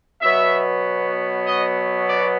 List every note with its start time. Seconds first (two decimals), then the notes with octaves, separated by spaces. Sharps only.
0.21 B2 F#3 B3 E5
1.46 D#5
2.09 D5